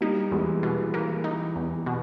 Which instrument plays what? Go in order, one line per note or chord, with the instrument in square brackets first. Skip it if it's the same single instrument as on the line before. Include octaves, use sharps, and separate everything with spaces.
[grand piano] G3 A#3 [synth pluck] D#4
[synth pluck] E2 [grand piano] E3 G#3
[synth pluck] B2 [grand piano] E3
[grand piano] E3 [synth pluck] A#3
[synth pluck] D#4
E2
B2